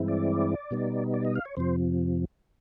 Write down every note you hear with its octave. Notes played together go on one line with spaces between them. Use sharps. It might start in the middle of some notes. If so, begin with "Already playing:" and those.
Already playing: G2 E3 G#3 C4 E4
D5
B2 G3 B3 D#4
D5
D#5
F5
C#5
F2 C3 F3 C5